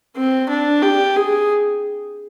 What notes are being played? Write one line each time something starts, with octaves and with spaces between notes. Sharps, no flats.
C4
D4
G4
G#4